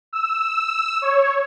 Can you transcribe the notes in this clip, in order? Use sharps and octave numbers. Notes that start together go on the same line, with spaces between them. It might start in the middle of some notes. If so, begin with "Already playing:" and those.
E6
C#5